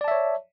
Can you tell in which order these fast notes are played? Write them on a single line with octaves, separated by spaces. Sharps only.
D5 A5 E5 C#5